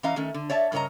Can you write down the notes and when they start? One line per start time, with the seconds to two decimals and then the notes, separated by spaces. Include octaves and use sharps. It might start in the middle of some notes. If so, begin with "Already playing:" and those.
0.03 E3 C#4 D#5 F5 A#5
0.16 D#3 A3 C#4
0.34 D3
0.50 C#5 D5 E5 A5
0.72 G2 C#3 A#4 C#5 D#5 A#5